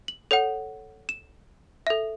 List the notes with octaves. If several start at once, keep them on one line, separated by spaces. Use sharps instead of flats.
F#7
A4 C#5 F#5
E7
A4 E5